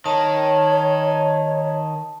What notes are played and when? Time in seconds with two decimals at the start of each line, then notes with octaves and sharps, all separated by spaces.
0.06 D#3 C#5 A5